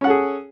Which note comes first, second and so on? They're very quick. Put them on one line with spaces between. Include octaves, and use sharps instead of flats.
C#4 F#5 A4 G#4